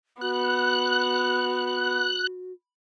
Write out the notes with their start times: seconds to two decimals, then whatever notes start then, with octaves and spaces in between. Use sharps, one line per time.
0.21 B3 F#4 F#6